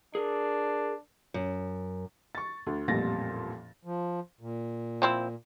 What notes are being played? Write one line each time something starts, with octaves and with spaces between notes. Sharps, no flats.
D4 G#4 A#4
F#2
C#6 A6
D2
A1 F2 A#2 G3 A6 A#6
F3
A#2
F3 C4 E4